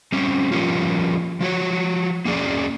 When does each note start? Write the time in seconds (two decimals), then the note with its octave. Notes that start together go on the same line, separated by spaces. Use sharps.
0.12 G3 C4 C#4
0.52 F3 G3 A#3 C#4 F4
1.41 F3 F#4 C#5
2.25 A#3 C#4 G#4 D5